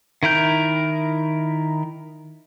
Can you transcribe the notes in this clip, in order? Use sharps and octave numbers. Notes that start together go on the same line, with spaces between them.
D#3 E4 A#4 G6